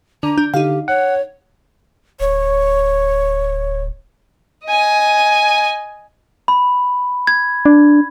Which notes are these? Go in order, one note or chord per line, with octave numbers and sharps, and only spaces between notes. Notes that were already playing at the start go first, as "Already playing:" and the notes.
D3 D4 A#5
D4 G6
D3 D#4 G4 F5
C#5 F#5
D1 C#5
D#5 G#5
B5
G#6
D4